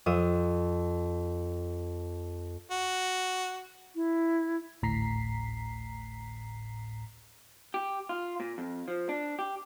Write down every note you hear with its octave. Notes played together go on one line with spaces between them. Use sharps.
F2 F5 D#6 E6
F#4
E4
G#1 D2 A2 A#5 B6 C7
G4
F4
A#2
F2
F3
D4
G4